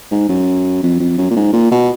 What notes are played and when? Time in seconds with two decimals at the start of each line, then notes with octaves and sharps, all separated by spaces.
0.11 G#2
0.29 F#2
0.83 F2
1.00 F2
1.18 F#2
1.30 A#2
1.36 G#2
1.53 A#2
1.71 B2